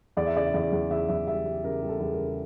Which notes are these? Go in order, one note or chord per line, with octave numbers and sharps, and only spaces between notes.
E2 D5
E5
C#3 D5
E5
E2 D5
E2
E2 E5
E2 E5
G3 E5
G3
C#3 A#4
G3
A4
E2
A#4
C#3